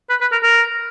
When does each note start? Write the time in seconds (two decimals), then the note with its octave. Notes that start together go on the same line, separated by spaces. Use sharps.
0.10 B4
0.21 B4
0.32 A#4
0.43 A#4